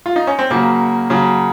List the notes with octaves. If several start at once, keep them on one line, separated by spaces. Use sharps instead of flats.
F4
D#4
C#4
C4
C#3 F#3 A#3
C#3 F#3